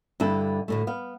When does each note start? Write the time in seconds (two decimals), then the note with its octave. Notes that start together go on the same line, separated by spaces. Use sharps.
0.20 G2 D3 E4 A4
0.68 D2 A2 A3
0.87 B3 F5